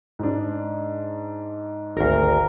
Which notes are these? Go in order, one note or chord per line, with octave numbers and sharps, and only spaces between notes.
G#2 D4
G#1 D2 A#4